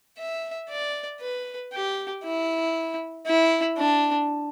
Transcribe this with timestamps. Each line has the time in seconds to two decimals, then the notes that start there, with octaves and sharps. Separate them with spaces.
0.18 E5
0.69 D5
1.20 B4
1.73 G4
2.24 E4
3.26 E4
3.77 D4